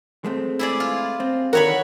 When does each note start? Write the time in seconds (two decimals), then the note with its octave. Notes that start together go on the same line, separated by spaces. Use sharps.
0.24 G#3 A3 C4
0.59 E4 G#4 D5
0.80 F4
1.20 C4
1.53 D3 D#3 F#4 A#4 C#5 B5